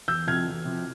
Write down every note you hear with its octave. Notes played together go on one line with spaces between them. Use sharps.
E2 E6 G6
C3 F3 F6 G#6
E2
C3 F3